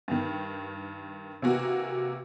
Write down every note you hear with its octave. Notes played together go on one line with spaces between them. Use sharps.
G2 D#3
C3 E3 A#3 F#4